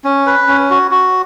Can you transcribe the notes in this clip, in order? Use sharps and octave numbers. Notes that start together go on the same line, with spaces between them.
C#4
B4
C#4
F#4
F#4